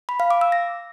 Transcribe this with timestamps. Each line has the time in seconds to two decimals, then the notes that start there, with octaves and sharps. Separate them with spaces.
0.09 B5
0.20 F5
0.31 D6
0.41 E6
0.52 A#6